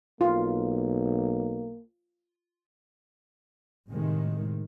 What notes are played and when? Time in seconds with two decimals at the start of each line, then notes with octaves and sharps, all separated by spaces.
0.21 B1 A#3 F4
3.88 A2 C3 D#3 G#3